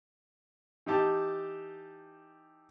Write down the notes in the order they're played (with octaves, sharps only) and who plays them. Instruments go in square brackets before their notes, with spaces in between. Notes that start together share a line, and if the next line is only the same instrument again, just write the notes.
[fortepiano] E3 D#4 G4 A5